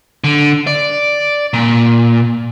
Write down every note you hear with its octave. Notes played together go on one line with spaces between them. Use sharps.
D3
D5
A#2